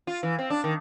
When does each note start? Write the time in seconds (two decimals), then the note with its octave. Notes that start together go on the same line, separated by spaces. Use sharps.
0.07 F4
0.23 E3
0.39 C4
0.50 D4
0.64 D#3